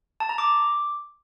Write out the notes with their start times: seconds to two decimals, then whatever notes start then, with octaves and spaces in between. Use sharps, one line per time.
0.20 A5
0.29 A#5
0.38 D6